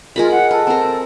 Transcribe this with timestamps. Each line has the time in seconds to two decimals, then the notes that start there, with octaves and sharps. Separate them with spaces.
0.16 G#3 F4 A#4 B5
0.30 F#5
0.51 A4 B4
0.67 C4 A#4